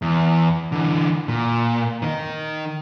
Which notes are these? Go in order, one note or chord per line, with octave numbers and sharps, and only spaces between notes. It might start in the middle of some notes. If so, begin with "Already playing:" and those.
E2
D3 E3
A#2
D#3 D#4